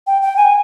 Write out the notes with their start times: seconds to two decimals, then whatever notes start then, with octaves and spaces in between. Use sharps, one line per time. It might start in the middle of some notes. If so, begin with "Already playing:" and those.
0.07 G5
0.22 G5
0.37 G#5